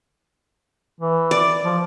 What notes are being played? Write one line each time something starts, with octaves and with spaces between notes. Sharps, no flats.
E3
D5
F3